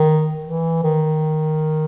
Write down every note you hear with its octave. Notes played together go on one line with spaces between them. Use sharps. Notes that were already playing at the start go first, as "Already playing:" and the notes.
Already playing: D#3
E3
D#3